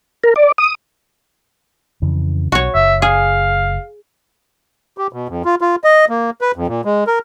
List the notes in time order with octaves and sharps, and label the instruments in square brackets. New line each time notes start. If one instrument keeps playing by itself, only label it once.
[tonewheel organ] A#4
D5
D#6
[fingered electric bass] F2 C#3 E3
[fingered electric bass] B1 [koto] F#4 C#5
[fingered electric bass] F#1 [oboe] E5
[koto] G#4 [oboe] F5
[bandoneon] G4
B2
F2
F4
F4
D#5
A#3
B4
F2
A#2
G#3
A#4